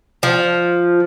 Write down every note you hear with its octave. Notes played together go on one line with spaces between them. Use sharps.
F3